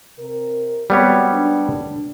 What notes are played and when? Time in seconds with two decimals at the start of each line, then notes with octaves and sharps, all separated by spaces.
0.19 C3 A#4
0.90 G3 G#3 B3 C4 F#4 C#5
1.32 D4